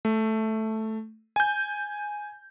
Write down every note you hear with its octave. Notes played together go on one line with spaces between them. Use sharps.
A3
G#5 G6